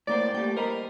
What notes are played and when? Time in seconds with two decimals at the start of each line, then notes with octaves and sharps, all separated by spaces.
0.07 A2 A#3 C5 D5
0.34 G3 A3 A#3 G5
0.56 A#4 C5 D#5 B5